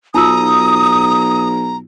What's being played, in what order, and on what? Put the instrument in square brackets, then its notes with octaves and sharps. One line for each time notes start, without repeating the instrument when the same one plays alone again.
[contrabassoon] B1 [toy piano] D#4 F4 E6 [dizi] A#5 [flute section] D#6